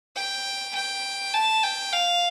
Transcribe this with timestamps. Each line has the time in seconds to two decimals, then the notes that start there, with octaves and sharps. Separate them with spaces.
0.16 G5
0.75 G5
1.34 A5
1.64 G5
1.93 F5